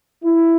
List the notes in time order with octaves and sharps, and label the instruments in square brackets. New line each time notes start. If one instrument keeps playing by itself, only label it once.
[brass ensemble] E4